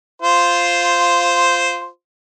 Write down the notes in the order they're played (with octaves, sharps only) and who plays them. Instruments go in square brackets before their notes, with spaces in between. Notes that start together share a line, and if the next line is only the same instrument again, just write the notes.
[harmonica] F4 C5